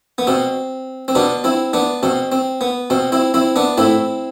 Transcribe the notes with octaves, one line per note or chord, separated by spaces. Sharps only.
B3
B2 C4
C4
B2 B3 D4
C4 E4
B3 D4
B2 C4
C4
B3
B2 C4
C4 E4
C4 E4
B3 D4
A2 C4 E4